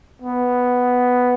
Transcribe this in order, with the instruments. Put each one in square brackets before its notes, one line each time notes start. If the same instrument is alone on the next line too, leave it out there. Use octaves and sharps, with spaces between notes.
[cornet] B3